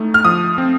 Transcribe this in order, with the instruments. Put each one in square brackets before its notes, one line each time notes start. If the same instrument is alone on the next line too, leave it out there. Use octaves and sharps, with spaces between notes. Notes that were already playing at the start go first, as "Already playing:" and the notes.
Already playing: [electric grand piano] A2 A3 D#4
[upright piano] F6
[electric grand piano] F3 [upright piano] D#6
[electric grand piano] C4